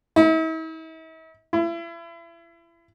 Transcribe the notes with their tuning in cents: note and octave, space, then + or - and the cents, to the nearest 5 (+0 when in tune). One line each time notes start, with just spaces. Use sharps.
E4 -45
E4 +35